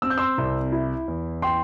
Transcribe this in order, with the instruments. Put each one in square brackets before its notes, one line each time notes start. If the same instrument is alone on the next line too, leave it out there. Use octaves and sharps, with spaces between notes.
[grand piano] C4 E6
G6
C6 E6
C2
E4
E2
G5 C6